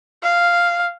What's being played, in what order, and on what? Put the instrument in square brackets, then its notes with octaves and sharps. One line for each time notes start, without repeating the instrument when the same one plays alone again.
[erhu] F5